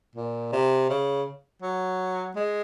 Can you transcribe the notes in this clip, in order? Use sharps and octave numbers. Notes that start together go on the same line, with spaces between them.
A#2
C3
C#3
F#3
G#3